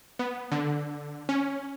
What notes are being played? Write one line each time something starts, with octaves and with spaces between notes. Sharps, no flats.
B3
D3
C#4